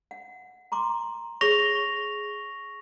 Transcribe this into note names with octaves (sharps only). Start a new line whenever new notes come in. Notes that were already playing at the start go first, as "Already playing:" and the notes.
F#5
A#5 C6 D6
G#4 C#5 C#6 A#6 F7